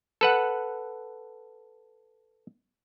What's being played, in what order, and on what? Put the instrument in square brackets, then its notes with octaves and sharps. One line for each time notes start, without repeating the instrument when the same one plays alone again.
[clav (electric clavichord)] A4 B4 F#5